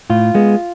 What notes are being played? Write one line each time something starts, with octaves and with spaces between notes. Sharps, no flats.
A2 F4
G#3 B3